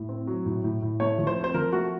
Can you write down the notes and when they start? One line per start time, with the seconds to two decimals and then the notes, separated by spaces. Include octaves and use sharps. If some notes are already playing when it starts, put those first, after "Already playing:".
Already playing: A2
0.09 C4
0.27 F#3
0.45 A2
0.64 A2
0.82 A2
1.00 A3 C#5
1.18 F3
1.27 C5
1.36 C4
1.44 C5
1.54 F3 A#4
1.72 A3 F#4